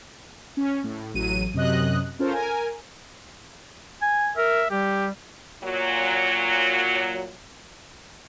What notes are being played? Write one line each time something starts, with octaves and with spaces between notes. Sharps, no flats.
C#4
A2
A1 F#3 D#7
F#2 C3 D#5 F#6
C#4 F4 A4 A#4 C5
A#4 G#5
G#5
A#4 E5
G3 G4
A#2 F#3